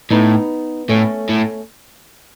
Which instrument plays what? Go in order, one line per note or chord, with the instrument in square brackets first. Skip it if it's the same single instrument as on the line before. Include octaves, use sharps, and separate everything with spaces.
[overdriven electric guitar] A2 [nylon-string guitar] B3 D#4
[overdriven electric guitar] A2 [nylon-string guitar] A3 C#4
[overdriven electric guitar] A2